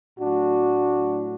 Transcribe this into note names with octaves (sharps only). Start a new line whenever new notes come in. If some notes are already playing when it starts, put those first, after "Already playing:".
A2 F#3 A3 D4 F#4